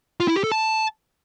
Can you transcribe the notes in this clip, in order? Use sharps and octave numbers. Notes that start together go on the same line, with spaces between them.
F4
E4
G4
A4
A5